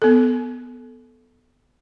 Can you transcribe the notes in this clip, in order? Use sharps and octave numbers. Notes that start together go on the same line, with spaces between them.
B3 A4